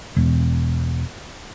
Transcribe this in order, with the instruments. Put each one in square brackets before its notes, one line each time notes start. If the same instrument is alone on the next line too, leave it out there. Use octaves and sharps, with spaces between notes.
[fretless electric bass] E1